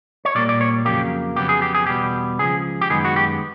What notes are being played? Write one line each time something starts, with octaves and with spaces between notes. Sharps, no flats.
C#5
A#2 G3 A#3 D5
D5
C#5
F2 C#3 F#3 A#3 G4
F2 C#3 F#3 B3 G4
G#4
G4
G#4
E2 B2 G3 B3 G4
C#2 C#3 F3 G#4
G4
F#2 D#3 G#3 B3 G#4
F#4
G4